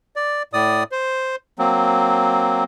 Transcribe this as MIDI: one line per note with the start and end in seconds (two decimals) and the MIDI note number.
0.16 0.43 74
0.53 0.83 45
0.53 0.83 74
0.53 0.83 87
0.92 1.36 72
1.59 2.64 54
1.59 2.64 58
1.59 2.64 60